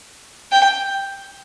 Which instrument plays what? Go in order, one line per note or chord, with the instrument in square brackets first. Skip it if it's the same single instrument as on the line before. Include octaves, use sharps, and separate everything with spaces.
[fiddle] G5